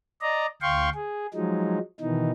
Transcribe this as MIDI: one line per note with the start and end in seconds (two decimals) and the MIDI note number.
0.21 0.46 74
0.21 0.46 75
0.21 0.46 82
0.62 0.89 38
0.62 0.89 77
0.62 0.89 79
0.62 0.89 84
0.62 0.89 85
0.95 1.27 68
1.34 1.79 53
1.34 1.79 54
1.34 1.79 56
1.34 1.79 63
2.01 2.31 47
2.01 2.31 51
2.01 2.31 52
2.01 2.31 63